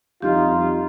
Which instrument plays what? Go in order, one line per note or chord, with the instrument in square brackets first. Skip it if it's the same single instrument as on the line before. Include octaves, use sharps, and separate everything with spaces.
[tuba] F2 [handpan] G3 D#4 [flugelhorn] F4 [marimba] G4